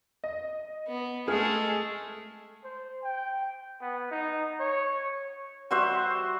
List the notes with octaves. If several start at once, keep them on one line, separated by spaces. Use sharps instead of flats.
D#5
B3
G#3 A3 G#4 F6
C5
G5
B3
D#4
C#5
G3 F#4 C5 E5